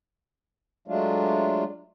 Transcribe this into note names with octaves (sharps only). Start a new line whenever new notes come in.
F#3 G#3 A3 D4 F4